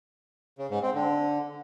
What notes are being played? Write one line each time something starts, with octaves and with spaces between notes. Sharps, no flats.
C#3
G#2
C4
D3